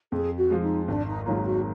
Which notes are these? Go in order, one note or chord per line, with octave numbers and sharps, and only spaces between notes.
F2 G#4
F#4
F3 G#3
D#4
G#1 D4
D#4
G#2 D#3 F#3 A#3 F4
F#4